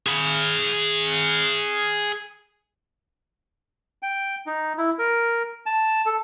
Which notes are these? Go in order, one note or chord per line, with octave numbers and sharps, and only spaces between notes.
G#4 B5
G5
D#4
E4
A#4
A5
A4